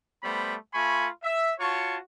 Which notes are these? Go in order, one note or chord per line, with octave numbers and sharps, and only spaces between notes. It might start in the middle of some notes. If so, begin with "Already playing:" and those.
G3 A3 B3 C5 B5
A3 F4 G#5 B5 C#6
E5
F4 F#4 C#5 A5 C#6